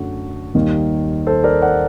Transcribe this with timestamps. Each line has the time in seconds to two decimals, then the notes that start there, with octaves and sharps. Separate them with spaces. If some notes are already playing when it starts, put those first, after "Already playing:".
Already playing: F#2 D3 A3 F#4
0.55 D#2 D#3 G3
1.27 A4 C5
1.44 A#4 D5
1.62 D5 F#5